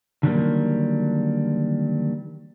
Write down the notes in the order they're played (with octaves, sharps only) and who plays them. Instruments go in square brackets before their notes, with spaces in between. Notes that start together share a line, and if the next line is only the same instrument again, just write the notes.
[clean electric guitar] D3 D#3 F#3 G3 A3 A#3